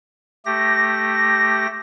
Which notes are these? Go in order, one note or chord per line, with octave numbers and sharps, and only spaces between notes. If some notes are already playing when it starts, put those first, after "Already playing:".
A3 G4 A#6